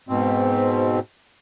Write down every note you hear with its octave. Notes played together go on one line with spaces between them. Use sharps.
G#2 B2 C4